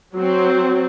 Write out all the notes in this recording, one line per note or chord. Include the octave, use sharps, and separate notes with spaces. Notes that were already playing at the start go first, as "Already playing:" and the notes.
F#3 C4